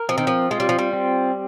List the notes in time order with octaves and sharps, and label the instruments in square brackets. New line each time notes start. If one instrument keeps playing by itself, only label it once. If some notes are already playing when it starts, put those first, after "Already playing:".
Already playing: [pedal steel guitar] A#4
[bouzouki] F3 [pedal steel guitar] C4
[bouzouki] D#3
F3
[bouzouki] G#3 [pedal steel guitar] F4
[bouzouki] G3
F3
G3
[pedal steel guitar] C4